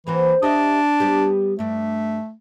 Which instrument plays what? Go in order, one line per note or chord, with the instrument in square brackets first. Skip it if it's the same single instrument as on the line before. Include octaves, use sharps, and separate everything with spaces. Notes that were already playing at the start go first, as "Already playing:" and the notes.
[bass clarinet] E3 [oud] A#3 C4 F#4
[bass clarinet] D4 [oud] G4 D#5 E5
[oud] G3 B3 G4
[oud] G2 D4 [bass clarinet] A3